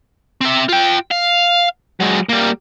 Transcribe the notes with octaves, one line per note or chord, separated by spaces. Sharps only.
C4 E5
F4 G5
F5
F#3 G#3
G3 A#3